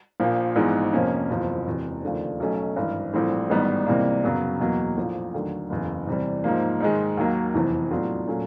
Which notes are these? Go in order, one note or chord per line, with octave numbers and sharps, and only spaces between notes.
A#1 A#2 F3
A#1 G#2 E3 G#3 B3
F2 C3 F3 A#3 C#4
F#1 E2 C3 F3
E1 E2 C3
D#2 C#3 F3 A3 D4
B1 B2 F#3 A3 C#4
G#1 G2 E3
A#1 A2 E3 G3 C4
A1 G#2 D#3 G3 B3
C#2 C3 E3 G3 A#3
F#2 C#3 F#3 B3
E2 B2 F#3 A#3
A#1 A2 F3
D#2 D3 F#3 A3
F#1 E2 C#3
E2 C3 E3 G3
G#2 F3 A#3
G#2 D#3 G#3
D#2 D#3 F#3 A#3
F1 E2 C3 E3
A2 F#3 B3 D4 F4
A#2 F#3 A3 C#4